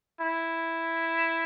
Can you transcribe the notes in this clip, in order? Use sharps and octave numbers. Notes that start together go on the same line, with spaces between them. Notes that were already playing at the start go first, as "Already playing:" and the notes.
E4